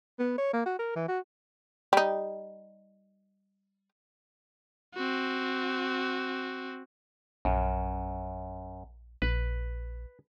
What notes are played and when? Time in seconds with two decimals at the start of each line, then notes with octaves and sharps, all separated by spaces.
0.19 B3
0.38 C#5
0.53 A#3
0.66 F#4
0.79 A#4
0.96 E3
1.08 F#4
1.93 G3 D#4
4.95 C4 F#4
7.45 A#1 F#2
9.22 A#1 B4